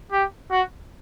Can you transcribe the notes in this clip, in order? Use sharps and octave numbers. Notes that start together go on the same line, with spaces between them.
G4
F#4